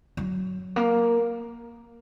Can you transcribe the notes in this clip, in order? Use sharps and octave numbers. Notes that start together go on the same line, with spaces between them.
F#3
A#3